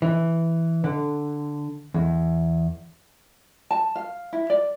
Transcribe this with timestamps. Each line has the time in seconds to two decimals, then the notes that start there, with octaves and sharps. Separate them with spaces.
0.02 E3
0.84 D3
1.94 E2
3.71 A5
3.95 F5
4.33 E4
4.50 D5